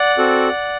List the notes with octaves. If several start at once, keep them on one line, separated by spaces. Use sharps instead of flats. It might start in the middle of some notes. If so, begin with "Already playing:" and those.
Already playing: D5 F#5
C4 F#4 A4